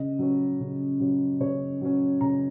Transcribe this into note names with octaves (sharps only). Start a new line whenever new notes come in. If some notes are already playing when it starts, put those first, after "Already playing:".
Already playing: C#3 D#5
F#3 C#4
C#3
F#3 C#4
C#3 C#5
F#3 C#4
C#3 A#5